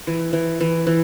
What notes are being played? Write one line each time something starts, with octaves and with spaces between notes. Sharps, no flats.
E3
E3
E3
E3